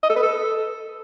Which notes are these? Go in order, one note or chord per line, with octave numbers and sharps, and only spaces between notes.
D#5
A4
B4
A4